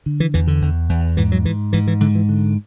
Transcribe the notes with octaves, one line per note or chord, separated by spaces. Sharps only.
D3
E3
E2 E3
D3
E2
E2
G#2 E3
F#3
G#2 E3
G#2 E3
E3
G#2 D3
E3
D3